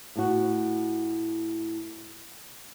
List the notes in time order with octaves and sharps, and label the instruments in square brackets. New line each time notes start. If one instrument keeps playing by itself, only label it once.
[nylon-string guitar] A2 F#4